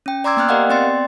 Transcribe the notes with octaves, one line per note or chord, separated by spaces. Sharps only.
C#4 G5
D5 A#5 C6 D6 E6 G#6
A#3 B3 G5 F6 F#6
G4 A#4 D5 D#5 F5 F#5
B3 C4 D5 G5 C6 A6